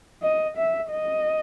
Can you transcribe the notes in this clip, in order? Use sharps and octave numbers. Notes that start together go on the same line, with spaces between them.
D#5
E5
D#5